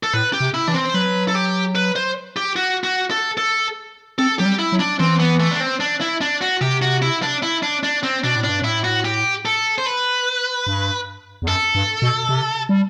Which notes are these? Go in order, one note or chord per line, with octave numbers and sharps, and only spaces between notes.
A4
A2 B4
G4
C3
E4
E3 D4
C4
C5
F#3 B4
A4
G4
B4
C5
G4
F#4
F#4
A4
A4
C4 A4
F#3 G4
G3
E4
F#3
D4
E3 C4
B3
A3
D4
C4
D4
E4
D4
F#4
C3 G4
F#4
E4
D4
E4
D4
D4
C4
B2 D4
A2
D4
G2
A2 E4
F#4
G4
A4
C5
B4
G2
E2
F#2 A4
G2
B2
C3
G3